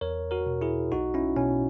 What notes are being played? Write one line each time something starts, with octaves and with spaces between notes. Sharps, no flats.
E2 A#4 C#5
F#4 A#4
B2
E4 G#4
B1 D#4 F#4
C#4 E4
B2 C#4